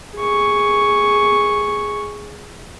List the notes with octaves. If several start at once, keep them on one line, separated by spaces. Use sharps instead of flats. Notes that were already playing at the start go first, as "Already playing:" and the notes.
G#4 C#6